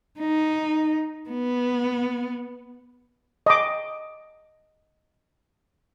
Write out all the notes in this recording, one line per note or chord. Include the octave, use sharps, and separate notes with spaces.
D#4
B3
D#5 D6